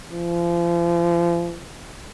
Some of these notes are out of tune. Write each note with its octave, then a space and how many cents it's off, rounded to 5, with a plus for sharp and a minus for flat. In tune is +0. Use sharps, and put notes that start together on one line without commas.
F3 -35